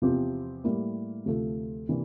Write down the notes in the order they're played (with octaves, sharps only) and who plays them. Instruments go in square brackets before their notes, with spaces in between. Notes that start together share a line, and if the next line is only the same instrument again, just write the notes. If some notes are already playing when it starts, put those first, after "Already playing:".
[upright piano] E2 C3 F3 C4 G4
A2 G3 A#3 E4
D2 C3 F3 A3
C3 E3 A#3 D4